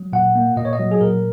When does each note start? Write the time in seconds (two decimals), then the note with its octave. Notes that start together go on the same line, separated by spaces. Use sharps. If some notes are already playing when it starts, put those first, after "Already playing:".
Already playing: F#3
0.13 A#2 F#5
0.35 A#3
0.57 A#2 D#5
0.65 C#5
0.73 D#5
0.79 F#3
0.91 G#4
1.01 A#2 A#4